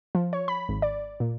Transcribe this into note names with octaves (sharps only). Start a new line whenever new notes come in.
F3
C#5
B5
G#1
D5
A#2